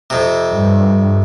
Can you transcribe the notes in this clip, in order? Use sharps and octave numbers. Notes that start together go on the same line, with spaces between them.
F2 C3
G2